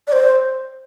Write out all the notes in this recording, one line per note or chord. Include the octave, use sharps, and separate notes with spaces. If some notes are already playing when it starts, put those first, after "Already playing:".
D5
C5